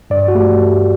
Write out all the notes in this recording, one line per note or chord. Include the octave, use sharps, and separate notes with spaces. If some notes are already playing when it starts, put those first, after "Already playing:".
G2 D5
F#4
A3 G4